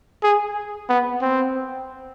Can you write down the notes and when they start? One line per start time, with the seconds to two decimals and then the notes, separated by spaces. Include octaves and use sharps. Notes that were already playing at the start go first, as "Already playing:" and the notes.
0.23 G#4
0.89 B3
1.21 C4